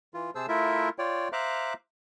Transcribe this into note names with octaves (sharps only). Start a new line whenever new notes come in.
E3 F4
C3 G#4 C5 A5 E6
A3 E4 F4 A#4 E5
F4 C#5 D5 G5
C5 E5 F5 A#5 D6 F#6